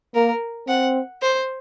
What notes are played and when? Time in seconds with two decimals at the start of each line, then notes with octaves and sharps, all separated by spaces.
0.14 A#3 A#4
0.68 C4 F#5
1.22 C5